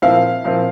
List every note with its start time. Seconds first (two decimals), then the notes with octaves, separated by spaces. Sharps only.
0.02 A#2 F3 C4 E4 F5
0.45 A#2 F3 C4 E4